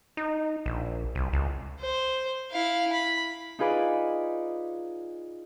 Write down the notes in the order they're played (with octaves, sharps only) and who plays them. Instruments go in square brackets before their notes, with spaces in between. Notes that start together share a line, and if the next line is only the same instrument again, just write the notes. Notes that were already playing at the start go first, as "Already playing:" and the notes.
[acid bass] D#4
A#1
C2
C#2
[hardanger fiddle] C5
E4 F5
B5
[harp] D#4 F4 G#4 B4 D5